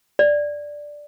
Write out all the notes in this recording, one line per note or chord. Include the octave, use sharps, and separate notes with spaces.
D5